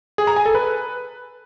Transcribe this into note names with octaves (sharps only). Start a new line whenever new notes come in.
G#4
A#5
G#5
A4
B4